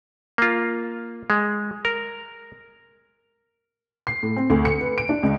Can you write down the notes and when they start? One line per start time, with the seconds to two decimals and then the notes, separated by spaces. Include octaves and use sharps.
0.38 A#3 F4
1.30 G#3
1.85 A#4
4.07 C7
4.23 A2
4.36 C4
4.50 D2
4.65 C#7
4.81 B4
4.98 D7
5.09 D4
5.23 C#2